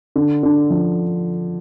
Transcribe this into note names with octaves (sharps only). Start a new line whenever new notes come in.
D3
D3
F3